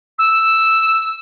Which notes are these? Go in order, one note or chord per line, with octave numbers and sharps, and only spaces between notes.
E6